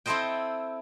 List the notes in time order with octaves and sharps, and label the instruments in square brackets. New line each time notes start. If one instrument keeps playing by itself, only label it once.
[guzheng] C4 E4 A4 C5 D#5 G5